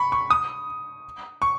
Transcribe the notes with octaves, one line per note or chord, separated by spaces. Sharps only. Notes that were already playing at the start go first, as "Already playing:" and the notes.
Already playing: B5 C#6
C#6
D#6
C#6